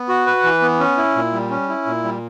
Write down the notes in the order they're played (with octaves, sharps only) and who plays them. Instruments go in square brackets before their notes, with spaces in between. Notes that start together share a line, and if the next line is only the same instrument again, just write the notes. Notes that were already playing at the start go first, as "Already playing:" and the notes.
Already playing: [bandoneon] B3
F#4
B4
E3
B3
C#4
E4
A#2
G3
C#4
E4
A#2
G3